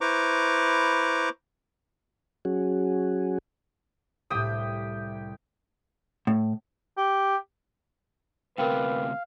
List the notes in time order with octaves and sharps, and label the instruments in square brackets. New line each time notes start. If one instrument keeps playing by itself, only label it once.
[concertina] E4 B4 C5 A#5 C#6 D6
[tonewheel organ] F#3 C#4 F#4 G#4
[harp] C2 A2 [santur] G4 G5 D#6
[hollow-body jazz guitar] A2
[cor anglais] G4
[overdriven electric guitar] D2 C3 [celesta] A#4 G5 [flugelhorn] B4 [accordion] F5